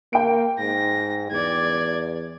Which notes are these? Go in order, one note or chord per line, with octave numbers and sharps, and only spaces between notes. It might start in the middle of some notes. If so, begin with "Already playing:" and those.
A#3 G5 D7
G#2 A#6
E2 D5 G#6